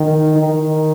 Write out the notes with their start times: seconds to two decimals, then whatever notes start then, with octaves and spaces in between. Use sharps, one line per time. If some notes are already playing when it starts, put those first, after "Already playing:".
Already playing: D#3
0.37 D#3